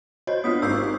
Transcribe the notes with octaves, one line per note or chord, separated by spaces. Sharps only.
F#4 C5 C#5 D#5
B3 D4 F4 D#6 B6
G#1 G4 E6 G6 C7